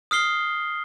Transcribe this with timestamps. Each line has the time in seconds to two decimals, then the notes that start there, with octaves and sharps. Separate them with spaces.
0.11 D#6 F6 C7 G7